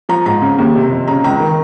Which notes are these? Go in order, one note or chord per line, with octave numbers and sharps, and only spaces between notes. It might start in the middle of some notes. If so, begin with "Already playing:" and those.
F3 A#5
G#2 A#5
C#3
D#2
C3
F2
C#3 A#5
C#2 A#5
D#3